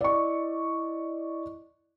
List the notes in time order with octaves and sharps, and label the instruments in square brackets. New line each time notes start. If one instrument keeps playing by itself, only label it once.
[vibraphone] E4 D#5 [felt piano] D5 C#6